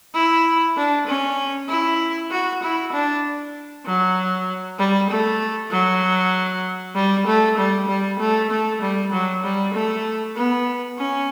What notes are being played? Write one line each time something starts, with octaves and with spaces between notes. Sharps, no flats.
E4
D4
C#4
E4
F#4
E4
D4
F#3
G3
A3
F#3
G3
A3
G3
G3
A3
A3
G3
F#3
G3
A3
B3
C#4